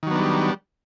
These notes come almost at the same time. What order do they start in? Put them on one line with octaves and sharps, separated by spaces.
D#3 F#3 B3 D4 G3